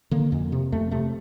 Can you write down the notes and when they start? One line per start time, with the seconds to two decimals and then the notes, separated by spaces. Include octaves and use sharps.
0.11 D3 A#3
0.32 F2
0.52 C3
0.72 F2 A3
0.91 C3 A3